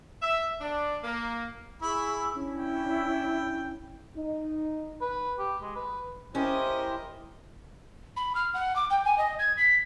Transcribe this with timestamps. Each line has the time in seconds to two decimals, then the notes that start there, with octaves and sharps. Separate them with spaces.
0.22 E5
0.61 D4
1.04 A#3
1.82 E4 G#4 B5 C#6 E6
2.34 C#4 D4 E4
2.57 G5
4.16 D#4
5.01 B4
5.39 G4
5.62 G#3
5.76 B4
6.35 C#4 E4 G4 A#4 C5 D#5
8.16 B5
8.35 F6
8.54 F#5
8.76 D6
8.90 G5
9.05 G#5
9.18 D#5
9.39 G#6
9.57 B6